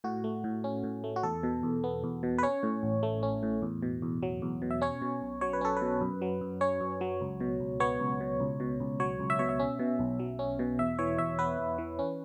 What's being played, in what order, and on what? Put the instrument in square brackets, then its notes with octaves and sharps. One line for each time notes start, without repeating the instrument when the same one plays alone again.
[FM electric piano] A2 F#4
A3
A2
C#4
A2
A3
F#4
E2 A4
B2
E2
B3
E2
B2
B4
C#4 C#5
A2
A1
A3
C#4
A2
E2
B2
E2
F#3
E2
B2
E5
C#4 C#5
B2
B1
F#3 C#5
B4
C#4 A4
B4
B2
F#2
F#3
F#2
C#4 C#5
F#2
F#3
C#2
B2
C#2
B3 C#5
C#2
B2
C#2
B2
C#2
F#3 C#5
C#2
E5
B2 C#5
E5
C#4
B2
B1
F#3
C#4
B2
E2 E5
E3 C#5
E2 E5
B3 B4
E2
E3
C#4